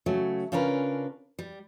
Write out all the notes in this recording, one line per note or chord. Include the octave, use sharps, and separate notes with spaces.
C#3 F#3 A3
C#3 C#4 D4 F4 A#4 B4
G3